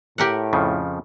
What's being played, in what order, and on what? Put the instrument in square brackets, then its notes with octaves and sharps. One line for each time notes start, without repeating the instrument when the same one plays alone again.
[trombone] A2 [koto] G4 A#4 F#5
[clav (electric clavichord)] F2 C#3 F3